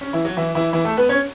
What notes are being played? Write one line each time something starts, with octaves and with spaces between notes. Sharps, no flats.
C#4
E3 E4
F#3 F#4
E3 E4
E3 E4
E3 E4
A3 A4
B3 B4
C#4 C#5